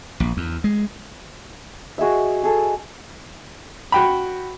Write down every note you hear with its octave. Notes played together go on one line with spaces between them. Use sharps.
A#1
E2
G#3
F#4 G#4 D#5 E5
G#4 A4
F#4 G5 B5